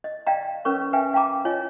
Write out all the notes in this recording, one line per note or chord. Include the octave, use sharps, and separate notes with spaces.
D#5
D5 D#5 F5 G5 A#5
C#4 A#4 B4 C#5 C#6
B4 E5 F5 G5 G#5
F5 G5 A5 A#5 D6
F4 C#5 D#5 G#5